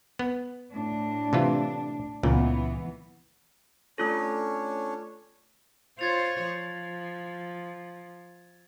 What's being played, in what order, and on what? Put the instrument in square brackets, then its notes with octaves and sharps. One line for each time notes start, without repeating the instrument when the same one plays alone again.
[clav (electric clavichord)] B3
[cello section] A2 D4
[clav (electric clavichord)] C3 E3 F4
[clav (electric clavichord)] C#2 A#2 [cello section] E3 B3
[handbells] A3 F4 A4 [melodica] C#4 D4 C#5
[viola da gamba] F4 C5 C#5 [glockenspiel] G#6 A6 F7
[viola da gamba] F3